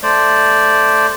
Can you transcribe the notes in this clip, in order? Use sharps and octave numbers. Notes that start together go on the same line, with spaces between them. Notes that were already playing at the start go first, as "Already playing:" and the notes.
A3 C5 D5